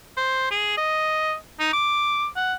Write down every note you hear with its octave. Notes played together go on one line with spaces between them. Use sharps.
C5
G#4
D#5
D#4
D6
F#5